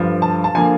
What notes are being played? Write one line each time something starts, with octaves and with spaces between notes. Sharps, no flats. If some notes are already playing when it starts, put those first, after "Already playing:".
Already playing: G2 D3 F3
A5
A5
D3 F3 A#3 G#5